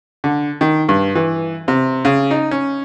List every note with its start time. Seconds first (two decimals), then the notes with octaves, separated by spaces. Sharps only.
0.24 D3
0.61 D#3
0.89 G2
1.15 E3
1.68 C3
2.05 C#3
2.31 D#4
2.51 C#4